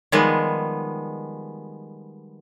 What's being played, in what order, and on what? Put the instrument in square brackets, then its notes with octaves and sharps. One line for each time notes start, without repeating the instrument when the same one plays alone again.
[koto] D#3 F3 G3 G#3 B3